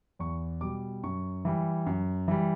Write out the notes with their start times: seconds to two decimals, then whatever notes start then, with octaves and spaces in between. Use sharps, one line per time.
0.19 E2 C#6
0.61 B2 G3 D6
1.03 F#2 C#6
1.45 E3 G3
1.86 F#2
2.28 E3 G3